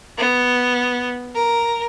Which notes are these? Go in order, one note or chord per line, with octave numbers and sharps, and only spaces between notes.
B3
A#4